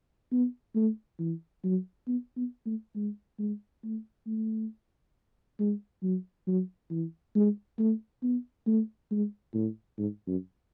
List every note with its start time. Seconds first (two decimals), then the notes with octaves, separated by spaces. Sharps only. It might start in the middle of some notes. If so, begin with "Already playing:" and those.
0.32 B3
0.75 A3
1.19 E3
1.64 F#3
2.07 B3
2.37 B3
2.66 A3
2.95 G#3
3.39 G#3
3.84 A3
4.27 A3
5.59 G#3
6.03 F#3
6.47 F#3
6.91 E3
7.35 G#3
7.79 A3
8.23 B3
8.67 A3
9.11 G#3
9.54 A2
9.99 G#2
10.27 F#2